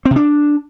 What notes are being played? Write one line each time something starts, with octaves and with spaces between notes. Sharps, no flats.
C4
C3
D4